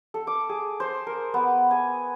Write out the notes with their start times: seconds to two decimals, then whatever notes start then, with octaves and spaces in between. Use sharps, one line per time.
0.14 A4
0.27 D6
0.49 G#4
0.80 C5
1.07 A#4
1.34 B3
1.71 G#5